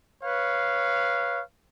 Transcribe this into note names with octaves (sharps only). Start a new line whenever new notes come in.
B4 C#5 F5